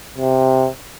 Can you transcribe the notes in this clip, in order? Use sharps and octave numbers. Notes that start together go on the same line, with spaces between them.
C3